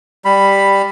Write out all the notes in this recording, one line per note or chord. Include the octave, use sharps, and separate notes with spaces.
G3 B5